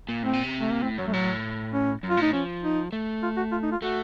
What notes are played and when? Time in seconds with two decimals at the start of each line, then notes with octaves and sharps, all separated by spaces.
0.09 A#2
0.23 A2 C4
0.33 A#2
0.44 C3
0.60 A3
0.72 A#3
0.83 A2 C4
0.97 F#2 F#3
1.07 A3
1.13 A2 F#3
1.73 C#4
2.03 F#2
2.10 F4
2.17 A2 D#4
2.33 F3 C#4
2.63 D#4
2.93 A3
3.23 F4
3.37 F#4
3.52 F4
3.63 D#4
3.72 F4
3.82 A3 F#4